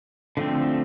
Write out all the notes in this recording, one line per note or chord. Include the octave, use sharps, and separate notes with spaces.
D3 F3 A3 C4